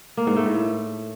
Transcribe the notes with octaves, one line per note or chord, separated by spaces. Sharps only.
A#3
G#2
A3
A2